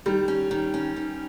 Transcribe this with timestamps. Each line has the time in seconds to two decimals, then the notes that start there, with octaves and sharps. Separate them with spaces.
0.06 D#3 G3
0.28 C#4
0.51 D#3
0.74 C#4
0.96 D#3